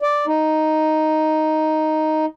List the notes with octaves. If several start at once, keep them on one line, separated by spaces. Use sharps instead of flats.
D5
D#4